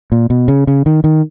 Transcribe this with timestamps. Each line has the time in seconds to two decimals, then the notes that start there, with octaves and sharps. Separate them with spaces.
0.12 A#2
0.30 B2
0.48 C#3
0.67 C#3
0.86 D#3
1.04 D#3